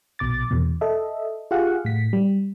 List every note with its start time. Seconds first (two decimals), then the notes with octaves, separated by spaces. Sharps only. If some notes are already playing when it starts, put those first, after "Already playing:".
0.19 A#1 B2 D6 A6
0.51 E2 B2
0.81 A4 D#5 E5
1.51 F4 G4 G#4 F5 F#5
1.85 A2 B6
2.13 G3